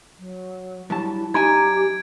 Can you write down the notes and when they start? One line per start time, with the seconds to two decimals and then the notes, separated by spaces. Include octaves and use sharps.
0.18 F#3
0.90 G2 F#3 E4 A5
1.34 F#2 D#4 G4 G#5 A#5 G#6 D7